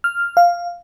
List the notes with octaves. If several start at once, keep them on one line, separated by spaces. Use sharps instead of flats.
F6
F5